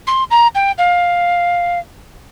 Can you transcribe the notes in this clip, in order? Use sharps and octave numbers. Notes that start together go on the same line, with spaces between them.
C6
A#5
G5
F5